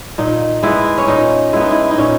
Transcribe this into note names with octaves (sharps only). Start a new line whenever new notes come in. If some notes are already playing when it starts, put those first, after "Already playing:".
A#2 D#4
G#3 B3 E4
C#4
A#2 D#4
G#3 B3 E4
D#4
E4
D#4
A#2 C#4